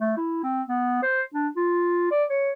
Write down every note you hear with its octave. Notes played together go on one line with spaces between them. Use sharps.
A3
E4
C4
B3
C5
D4
F4
D5
C#5